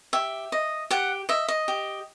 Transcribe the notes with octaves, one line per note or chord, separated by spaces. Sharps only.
G4 E5
D#5
G4 F#5
D#5 E5
D#5
G4